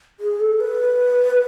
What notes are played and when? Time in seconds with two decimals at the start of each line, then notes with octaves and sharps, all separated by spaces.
0.20 G#4
0.40 A4
0.60 B4